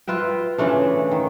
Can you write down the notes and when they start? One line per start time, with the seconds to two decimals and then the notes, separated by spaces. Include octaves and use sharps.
0.07 F4 B4 E5 G5
0.58 C#3 E3 A3 D4
1.11 D#3